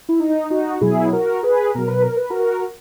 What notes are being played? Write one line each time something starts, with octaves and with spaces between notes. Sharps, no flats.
E4
D#4
D#4 F#4
B2 F#3 E4 G#4
F#4 A#4
G#4 B4
B2 F#3 A#4
B4
A#4
B4
F#4 A#4